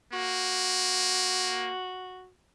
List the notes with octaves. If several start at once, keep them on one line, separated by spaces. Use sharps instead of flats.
A#3 F#4